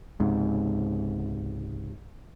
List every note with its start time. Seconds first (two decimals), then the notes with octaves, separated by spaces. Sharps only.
0.20 C#2 G#2 C3